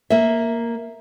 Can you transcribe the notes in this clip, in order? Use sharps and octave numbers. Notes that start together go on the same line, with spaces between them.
A#3 E5